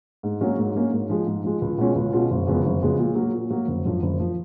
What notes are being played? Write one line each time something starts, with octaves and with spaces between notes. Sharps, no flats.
G#2
F#3 A#3 C#4
G#2
F#3 A#3 C#4
G#2
F3 G#3
G#2
F3 G#3
C#2
B2 G#3 C#4 F4
C#2
B2 G#3 C#4 F4
F#1
F2 C#3 G#3 B3
F#1
F2 C#3 G#3 B3
A#2
F#3 A#3
A#2
F#3 A#3
F#1
F#2 F3
F#1
F3